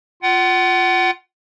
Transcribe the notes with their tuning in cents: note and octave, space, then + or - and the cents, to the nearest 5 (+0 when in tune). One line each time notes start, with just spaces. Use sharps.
F4 +0 F#5 +30